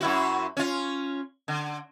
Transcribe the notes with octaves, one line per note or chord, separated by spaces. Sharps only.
F#2 E4 F#4
C#4 F4
D3